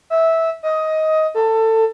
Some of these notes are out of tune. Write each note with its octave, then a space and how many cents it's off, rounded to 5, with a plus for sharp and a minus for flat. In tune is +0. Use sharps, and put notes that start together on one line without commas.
E5 -15
D#5 +15
A4 +20